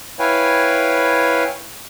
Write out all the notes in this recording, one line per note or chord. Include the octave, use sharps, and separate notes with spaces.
E4 B4 C#5 F5 G5 G#5